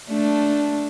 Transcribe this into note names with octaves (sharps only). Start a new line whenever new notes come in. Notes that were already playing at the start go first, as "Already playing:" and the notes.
A3 D4